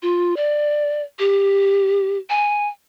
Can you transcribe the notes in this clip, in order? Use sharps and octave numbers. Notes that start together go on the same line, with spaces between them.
F4
D5
G4
G#5